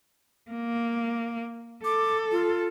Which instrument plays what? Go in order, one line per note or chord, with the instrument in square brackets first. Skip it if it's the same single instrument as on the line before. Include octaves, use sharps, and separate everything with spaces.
[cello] A#3
[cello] A4 [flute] D6
[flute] F4